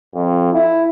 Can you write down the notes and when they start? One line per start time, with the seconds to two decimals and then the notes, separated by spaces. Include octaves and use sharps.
0.15 F2
0.54 E4